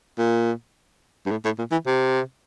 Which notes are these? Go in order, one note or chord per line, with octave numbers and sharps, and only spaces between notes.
A#2
G2
A2
A2
A#2
E3
C3